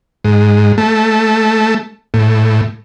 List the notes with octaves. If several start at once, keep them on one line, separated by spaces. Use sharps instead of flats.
G#2
A3
A2